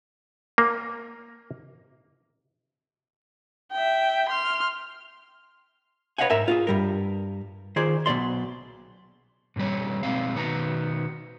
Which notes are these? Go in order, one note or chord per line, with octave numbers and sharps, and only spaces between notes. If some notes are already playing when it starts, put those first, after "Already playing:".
A#3
E5 G5
C6 F6
B4 C#5 D#5 F5 F#5 G#5
G#2 A#4 E5 G#5
F4 F#4 G#4
G2 G3 A#4
D#3 F4 G#4 C5 D5
B1 B2 C4 D5 C6
G#2 B2 E3 G3 C#5
B2 G#3 C4 F5
B2 D#3 B3 A5 A#5